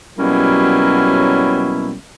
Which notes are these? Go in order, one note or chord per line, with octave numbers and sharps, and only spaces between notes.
B2 F#3 G3 A#3 C#4 E4